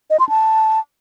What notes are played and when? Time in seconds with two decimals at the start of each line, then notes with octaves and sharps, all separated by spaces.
0.10 D#5
0.20 C6
0.29 A5